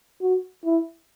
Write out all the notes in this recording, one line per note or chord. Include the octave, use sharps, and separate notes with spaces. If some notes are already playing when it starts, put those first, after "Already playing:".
F#4
E4